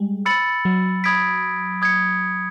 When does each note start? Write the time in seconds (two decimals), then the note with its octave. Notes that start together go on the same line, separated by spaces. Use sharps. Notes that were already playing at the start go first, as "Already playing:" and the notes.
Already playing: G3 G#3
0.26 B5 E6 A6 C#7 F#7
0.65 F#3
1.04 B5 D#6 G#6 B6 D7
1.82 D#6 G#6 C#7